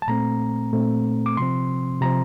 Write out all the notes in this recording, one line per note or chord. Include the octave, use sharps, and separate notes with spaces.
A5
A#2 A3 C4 A#5
A#2 A3 C4
D6
C3 F3 C4 C6
C3 F3 C4 A#5